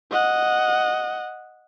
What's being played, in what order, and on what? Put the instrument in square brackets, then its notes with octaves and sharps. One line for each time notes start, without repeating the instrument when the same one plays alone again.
[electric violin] D#5 F#5